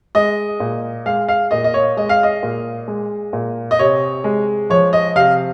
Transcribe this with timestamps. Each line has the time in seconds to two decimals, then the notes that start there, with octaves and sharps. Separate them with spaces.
0.15 G#3 D#5
0.60 A#2
1.06 G#3 F5
1.29 F5
1.51 A#2 D#5
1.64 D#5
1.74 C#5
1.97 G#3 D#5
2.09 F5
2.23 D#5
2.43 A#2
2.88 G#3
3.33 A#2
3.71 D#5
3.79 C3 C#5
4.24 G#3
4.70 F3 C#5
4.93 D#5
5.15 C3 F5